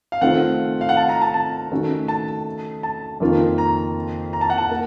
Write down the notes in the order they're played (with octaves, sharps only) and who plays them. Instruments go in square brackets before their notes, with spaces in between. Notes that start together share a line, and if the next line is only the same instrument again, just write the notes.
[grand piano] F5
[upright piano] D#3 A3 C4 F4 [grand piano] F#5
[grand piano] F5
F#5
A5
A#5
A5
A5
[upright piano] D#3 A3 C#4 F#4 A4
[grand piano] A5
A5
[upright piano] F2 D#3 A#3 F4
[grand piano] A#5
A#5
A5
F#5
A5
[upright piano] A#3